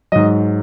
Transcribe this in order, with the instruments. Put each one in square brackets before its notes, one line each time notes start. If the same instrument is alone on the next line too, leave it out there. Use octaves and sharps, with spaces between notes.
[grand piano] G#2 F#3 D#5